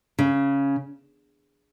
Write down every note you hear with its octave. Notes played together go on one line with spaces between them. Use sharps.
C#3